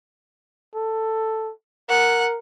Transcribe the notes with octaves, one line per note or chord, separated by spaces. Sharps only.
A4
A#4 F#5